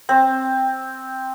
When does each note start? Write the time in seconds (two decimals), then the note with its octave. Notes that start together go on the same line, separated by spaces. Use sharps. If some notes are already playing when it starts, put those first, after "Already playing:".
0.09 C4